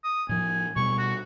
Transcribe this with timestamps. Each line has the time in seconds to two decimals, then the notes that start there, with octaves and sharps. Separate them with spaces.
0.04 D#6
0.29 A2 F3 G#5
0.76 B2 G3 B3 C#6
0.98 F#4